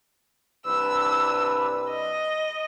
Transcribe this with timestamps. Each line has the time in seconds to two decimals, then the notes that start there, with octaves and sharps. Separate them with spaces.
0.66 C2 D4 B4 E6
1.90 D#5